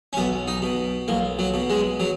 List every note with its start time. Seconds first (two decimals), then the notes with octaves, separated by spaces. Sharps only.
0.13 C#4
0.17 B1 B3
0.47 D#4
0.62 B2
1.08 B1 A#3
1.39 F#3
1.54 B2
1.70 G#3
2.00 F#3